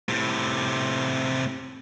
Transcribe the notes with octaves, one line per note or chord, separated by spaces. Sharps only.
A2 C3